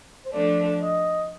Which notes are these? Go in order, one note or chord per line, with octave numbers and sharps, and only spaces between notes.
C5
F3 A3 D4 D5
D#5